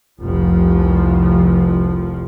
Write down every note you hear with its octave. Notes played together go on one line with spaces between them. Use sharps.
F1 C2 F3